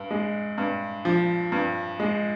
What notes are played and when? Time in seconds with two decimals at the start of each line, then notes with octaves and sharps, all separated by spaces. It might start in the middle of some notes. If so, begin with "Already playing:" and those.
Already playing: G2
0.11 G#3
0.58 G2
1.05 F3
1.52 G2
2.00 G#3